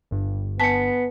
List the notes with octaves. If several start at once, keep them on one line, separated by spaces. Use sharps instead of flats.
G1 G2
B3 G#5 A5 B6 C#7